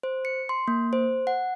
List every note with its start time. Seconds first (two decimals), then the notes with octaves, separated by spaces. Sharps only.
0.03 C5
0.25 C#7
0.49 C6
0.68 A#3
0.93 C5
1.27 F#5